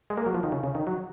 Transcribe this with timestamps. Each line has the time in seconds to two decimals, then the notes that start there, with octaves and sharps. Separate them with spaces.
0.10 G#3
0.17 A#3
0.26 F#3
0.35 F3
0.43 D#3
0.52 C#3
0.64 C#3
0.75 D#3
0.87 F#3